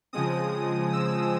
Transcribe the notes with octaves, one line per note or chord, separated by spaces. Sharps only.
C#3 F3 G#3 C4 D#6
E6